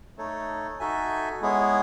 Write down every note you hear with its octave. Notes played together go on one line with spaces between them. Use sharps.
A3 D#4 A4 C#5
D#4 F#4 A4 E5 G#5
G#3 B3 E4 G#4 C#5